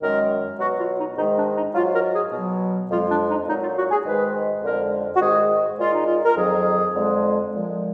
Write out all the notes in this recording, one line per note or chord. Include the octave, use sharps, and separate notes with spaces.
F#2 D#3 G#3 A#4
B2 F#3 F#4
F4
D#4
G#2 D#3 G#3 D#4
D4
D#4
G#2 F#3 F4
A#4
G#4
B2 F#3
F2 F3 G#3 F4
D4
D#4
A#2 F#3 D#4
F4
F#4
G#4
G#2 D#3 G#3 B4
F2 D3 G#3 A#4
F#4
G#2 D#3 G#3 G#4
A#2 G#3 F4
D#4
F4
A#4
F2 D#3 F#3 G#4
F2 D3 G#3
A#2 F3 G#3